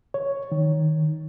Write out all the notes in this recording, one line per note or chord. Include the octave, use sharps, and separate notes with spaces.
C#5
D#3